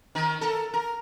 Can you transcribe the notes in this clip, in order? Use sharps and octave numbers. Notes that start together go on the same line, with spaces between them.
D#3 A#4
A4 A#4
A#4